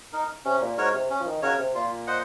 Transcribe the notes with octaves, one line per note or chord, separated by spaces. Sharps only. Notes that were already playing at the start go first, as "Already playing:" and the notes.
D#4 A#4
C3 C#4
A#2
G#2 F#4 A#4 C#5
C3
C#4
F3
D#3
C#3 F#4 A#4 C#5
C3
A#2 F4
C5 D#5 F#5